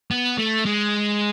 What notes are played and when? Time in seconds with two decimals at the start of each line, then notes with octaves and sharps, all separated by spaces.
0.11 B3
0.38 A3
0.66 G#3